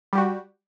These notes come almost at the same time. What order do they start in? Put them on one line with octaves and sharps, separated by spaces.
G3 G4 F#4